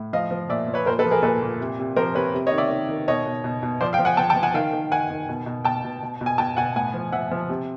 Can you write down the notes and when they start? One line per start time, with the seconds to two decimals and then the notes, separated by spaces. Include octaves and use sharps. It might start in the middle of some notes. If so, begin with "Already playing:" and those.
Already playing: A2
0.13 F3 D#5 F5
0.31 F3
0.49 A#2 D5 E5
0.68 F3
0.74 B4 C#5
0.86 A#2 A#4 C5
0.99 A4 B4
1.06 F3
1.11 G#4 A#4
1.23 A#2 A4 B4
1.42 A#2
1.61 C3
1.79 C3
1.96 F3 A#4 C5
2.15 C3 B4 C#5
2.34 C3
2.47 C#5 D#5
2.52 D#3
2.58 D5 E5
2.71 D#3
2.89 D#3
3.08 B2 C#5 D#5
3.26 B2
3.44 B2
3.63 B2
3.81 F3 C5 D5
3.93 F5 G5
3.99 F3
4.05 F#5 G#5
4.17 F3 G5 A5
4.30 G5 A5
4.36 F3
4.43 F#5 G#5
4.54 D#3 F5 G5
4.73 D#3
4.92 D#3 F#5 G#5
5.10 D#3
5.29 B2
5.46 B2
5.65 B2 G5 A5
5.84 B2
6.03 B2
6.21 B2
6.26 G#5
6.38 B2 G5 A5
6.57 B2 F#5 G#5
6.75 A2 F#5 G#5
6.94 F3
7.12 F3 E5 F#5
7.31 F3
7.49 C3